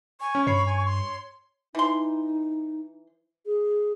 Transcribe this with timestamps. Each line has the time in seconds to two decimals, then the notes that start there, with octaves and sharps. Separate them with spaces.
0.21 G#5 C#6
0.35 C#4
0.47 G2 C#5 B5 C7
0.66 G#5
0.85 C6
1.75 E3 D#4 C6
3.46 G#4